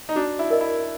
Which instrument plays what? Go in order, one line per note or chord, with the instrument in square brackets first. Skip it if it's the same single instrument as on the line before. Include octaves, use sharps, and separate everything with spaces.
[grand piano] D#4
[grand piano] D4 [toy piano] F#4
[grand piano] E4
[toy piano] A#4 D#5
[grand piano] E4